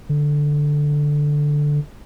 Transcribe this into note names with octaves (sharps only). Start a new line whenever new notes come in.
D3